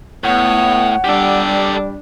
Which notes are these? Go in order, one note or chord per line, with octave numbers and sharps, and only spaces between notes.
A2 B3 C#5 F#5
G3 D4 G4 A4